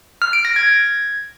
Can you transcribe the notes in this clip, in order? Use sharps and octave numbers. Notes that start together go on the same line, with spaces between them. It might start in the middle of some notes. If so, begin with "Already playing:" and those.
F6
D7
A#6
G#6